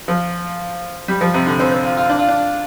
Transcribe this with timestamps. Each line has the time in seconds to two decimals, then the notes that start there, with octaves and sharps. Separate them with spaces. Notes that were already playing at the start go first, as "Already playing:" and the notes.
0.08 F3
1.08 G3
1.21 F3
1.34 C3
1.46 D3
1.59 C4
1.72 C4
1.84 F4
1.97 F4
2.09 D4
2.19 F4
2.28 D4